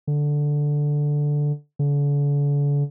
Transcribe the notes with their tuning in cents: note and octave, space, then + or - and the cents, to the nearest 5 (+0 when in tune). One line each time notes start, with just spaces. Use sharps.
D3 +0
D3 -40